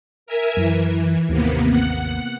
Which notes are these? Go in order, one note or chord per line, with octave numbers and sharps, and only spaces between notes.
A#4 E5 G#5
F#2 E3
G#1 D#2 C3 A#3 B3
F#5